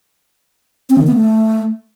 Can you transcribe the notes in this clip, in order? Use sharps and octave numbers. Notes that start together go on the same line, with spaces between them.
C4
D#3
B3
A3